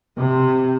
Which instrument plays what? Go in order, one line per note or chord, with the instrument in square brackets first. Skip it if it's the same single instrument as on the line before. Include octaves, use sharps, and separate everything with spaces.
[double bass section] C3